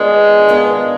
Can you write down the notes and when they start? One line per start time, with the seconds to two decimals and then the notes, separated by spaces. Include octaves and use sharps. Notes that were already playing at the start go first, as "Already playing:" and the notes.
Already playing: G#2 D#3 G#3 B3 D4 F4
0.49 G#2 D#3 B3 D4 F4